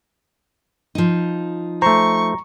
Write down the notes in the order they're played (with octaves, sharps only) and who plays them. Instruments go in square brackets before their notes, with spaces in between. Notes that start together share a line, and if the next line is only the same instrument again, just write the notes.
[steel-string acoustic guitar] F3 D#4
[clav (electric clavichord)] A3 C5 [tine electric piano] A#5 [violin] C#6